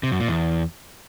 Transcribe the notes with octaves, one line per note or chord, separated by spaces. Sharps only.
C3
F#2
A#2
E2